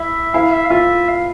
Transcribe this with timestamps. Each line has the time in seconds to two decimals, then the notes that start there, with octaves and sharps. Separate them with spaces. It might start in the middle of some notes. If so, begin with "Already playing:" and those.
Already playing: E4 E5
0.34 E4 F5
0.53 E5
0.65 F5
0.70 F4 E5
1.08 F5